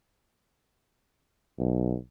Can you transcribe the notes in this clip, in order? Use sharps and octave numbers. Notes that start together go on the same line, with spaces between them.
B1